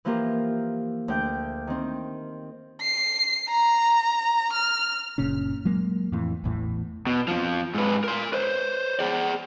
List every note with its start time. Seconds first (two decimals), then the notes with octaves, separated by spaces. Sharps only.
0.05 E3 F3 A#3 F4 G4 A#4
1.08 D2 G5 G6
1.67 D#3 C4
2.82 C7
3.49 A#5
4.53 F6
5.18 F#1 A#2 C#3 C#4
5.65 F#3 G#3 A#3
6.12 F2 A2 E3
6.44 A1 E2 A2 E3
7.07 B2
7.28 F2 F3
7.74 G#2 B4
8.04 A#4 C6
8.33 B4 C5
8.99 G#4 D5